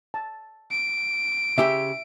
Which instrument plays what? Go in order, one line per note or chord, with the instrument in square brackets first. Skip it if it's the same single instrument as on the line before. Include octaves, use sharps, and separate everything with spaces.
[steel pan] A5
[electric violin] D7
[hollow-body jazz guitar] C#3 G4 C5 [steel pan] E5